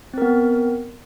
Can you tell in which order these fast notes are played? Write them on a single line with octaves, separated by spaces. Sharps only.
C4 A#4 B3